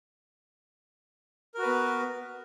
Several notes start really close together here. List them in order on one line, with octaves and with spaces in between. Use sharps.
A#4 F#4 B4 B3